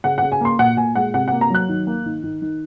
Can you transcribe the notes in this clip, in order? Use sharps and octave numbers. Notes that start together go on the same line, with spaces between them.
C#3 F#5
C#3 F#5
G#5
A#3 C6
A#2 F#5
A#2 G#5
G#3 F#5
C3 F#5
A#3 F#5
A#5
F#3 F#6
D#3
A#3
D#3
D#3
D#3